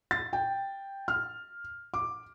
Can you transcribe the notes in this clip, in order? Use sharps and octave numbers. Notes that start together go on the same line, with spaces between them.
A6
G5
F6
D6